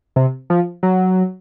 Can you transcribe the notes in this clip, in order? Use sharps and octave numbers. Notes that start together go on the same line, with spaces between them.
C3
F3
F#3